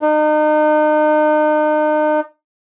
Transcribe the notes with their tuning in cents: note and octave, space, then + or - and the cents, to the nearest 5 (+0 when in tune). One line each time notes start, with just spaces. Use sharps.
D#4 -35